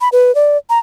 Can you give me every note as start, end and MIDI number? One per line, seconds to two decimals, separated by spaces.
0.01 0.09 83
0.12 0.34 71
0.35 0.57 74
0.70 0.79 82